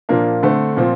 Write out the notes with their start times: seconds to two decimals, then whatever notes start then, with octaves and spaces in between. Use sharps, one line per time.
0.09 A#2 F3 A#3 D4
0.43 D3 A3 C4
0.77 A#2 F3 C4